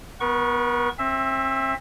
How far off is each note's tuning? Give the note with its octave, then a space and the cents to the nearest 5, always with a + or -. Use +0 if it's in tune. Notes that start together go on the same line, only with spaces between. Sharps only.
B3 +0 A#4 +45 C#6 -10
C4 +35 E5 +0